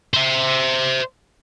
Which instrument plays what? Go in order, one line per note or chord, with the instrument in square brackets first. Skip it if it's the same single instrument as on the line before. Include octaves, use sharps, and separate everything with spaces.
[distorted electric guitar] C5 E5